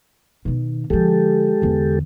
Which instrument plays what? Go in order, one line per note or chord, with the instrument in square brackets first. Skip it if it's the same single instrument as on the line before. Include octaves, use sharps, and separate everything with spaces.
[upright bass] B2 D#3
[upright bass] D3 F3 [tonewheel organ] G#3 G4 A4
[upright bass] E2 D3